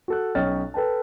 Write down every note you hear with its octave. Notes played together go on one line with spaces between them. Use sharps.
F#4 A4 F#6
B1 C#4 D#5 G5 F6 A6
A4 B4 G5 A5